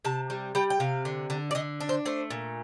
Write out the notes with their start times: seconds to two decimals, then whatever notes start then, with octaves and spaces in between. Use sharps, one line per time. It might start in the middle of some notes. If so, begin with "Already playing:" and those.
0.05 C3 A5
0.30 G3
0.55 G3 G5
0.70 G5
0.80 C3 F5
1.05 D3
1.30 D3
1.51 D5
1.55 D3 D#5
1.80 D4
1.89 C5
2.05 A3 C5
2.30 A#2